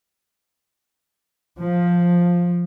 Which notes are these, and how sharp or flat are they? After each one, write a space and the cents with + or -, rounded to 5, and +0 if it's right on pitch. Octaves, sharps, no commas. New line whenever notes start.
F3 +5